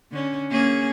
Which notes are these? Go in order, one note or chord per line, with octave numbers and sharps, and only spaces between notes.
D3 C#4
A#3 C#4 G#4